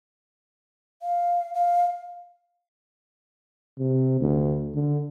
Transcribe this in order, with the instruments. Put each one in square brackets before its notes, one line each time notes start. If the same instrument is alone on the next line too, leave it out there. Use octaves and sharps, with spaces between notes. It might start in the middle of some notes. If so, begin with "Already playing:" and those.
[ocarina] F5
F5
[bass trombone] C3
D2
D3